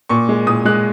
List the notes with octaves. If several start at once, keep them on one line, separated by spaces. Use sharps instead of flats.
A#2 C#6
G#3
A#2 D#6
G#3 F#6